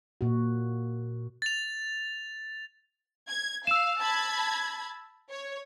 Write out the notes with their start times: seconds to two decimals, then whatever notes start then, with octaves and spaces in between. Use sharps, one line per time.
0.21 A#2 F#4
1.42 A6 F7
3.27 G#6
3.67 F5 E6 E7
4.01 A5 B5 G#6
5.32 C#5